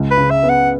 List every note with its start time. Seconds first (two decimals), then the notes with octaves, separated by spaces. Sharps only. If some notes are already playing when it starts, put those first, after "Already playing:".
Already playing: C#2
0.11 B4
0.17 C#3
0.30 E5
0.43 B3
0.49 F#5